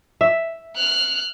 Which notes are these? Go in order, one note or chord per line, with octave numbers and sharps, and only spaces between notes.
E5
F6 F#6